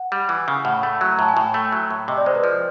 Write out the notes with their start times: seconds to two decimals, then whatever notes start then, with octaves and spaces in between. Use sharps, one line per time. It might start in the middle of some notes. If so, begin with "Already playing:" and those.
Already playing: F#5
0.12 G3
0.29 E3
0.48 C#3
0.65 A2 F#5
0.83 A3
1.01 F#3
1.12 A#5
1.19 A2 A5
1.28 G#5
1.37 A2 G5
1.54 A3
1.72 F#3
1.90 A2
2.08 C3 D#5
2.17 D5
2.26 G#3 C5
2.35 B4
2.44 F3